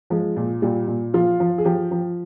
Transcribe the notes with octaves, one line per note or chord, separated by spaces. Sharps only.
F3 G#3
A#2
A#2 G3
A#2
F3 F4
F3
G#4
F3 G4
F3